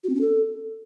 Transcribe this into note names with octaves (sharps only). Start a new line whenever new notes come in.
F#4
C4
C#4
A4